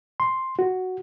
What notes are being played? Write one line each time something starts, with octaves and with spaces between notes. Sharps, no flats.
C6
F#4